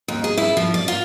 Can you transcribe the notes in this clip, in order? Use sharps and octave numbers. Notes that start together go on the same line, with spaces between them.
D#2
G#4
E4
F3
D5
F4